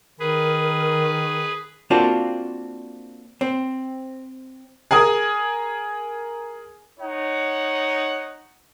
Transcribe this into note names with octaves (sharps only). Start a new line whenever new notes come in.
D#3 G#4 A#4 B4
A#3 C4 D4 F4 F#4 A4
C4
G#4 A#4 G#5 D#6
D#4 C#5 F#5